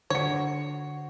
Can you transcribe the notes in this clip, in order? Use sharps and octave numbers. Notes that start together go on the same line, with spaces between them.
D3 F#4 C5 C#5 C#7